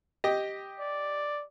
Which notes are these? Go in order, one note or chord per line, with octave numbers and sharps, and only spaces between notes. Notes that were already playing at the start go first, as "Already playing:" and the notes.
G4 D#5
D5